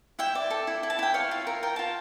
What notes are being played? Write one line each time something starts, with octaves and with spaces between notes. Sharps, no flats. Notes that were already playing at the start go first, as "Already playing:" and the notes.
E4 E5 G5
D5
A4
E4
E4
A5
E4 G5
C#5 F5
F4
A#4
A#4 G5
F4 A5